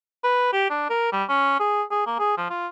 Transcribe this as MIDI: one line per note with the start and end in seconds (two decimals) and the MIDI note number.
0.24 0.52 71
0.53 0.66 67
0.70 0.89 62
0.90 1.12 70
1.12 1.24 55
1.29 1.56 61
1.60 1.83 68
1.91 2.06 68
2.07 2.18 58
2.19 2.37 68
2.37 2.49 53
2.50 2.67 65